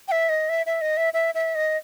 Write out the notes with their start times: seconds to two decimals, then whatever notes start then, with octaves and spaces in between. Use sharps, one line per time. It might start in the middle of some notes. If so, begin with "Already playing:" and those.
0.08 G5
0.12 E5
0.29 D#5
0.49 E5
0.66 E5
0.81 D#5
0.97 E5
1.14 E5
1.35 E5
1.55 D#5